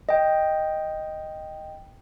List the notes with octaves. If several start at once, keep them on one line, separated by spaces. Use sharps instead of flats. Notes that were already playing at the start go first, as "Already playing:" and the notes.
D#5 G5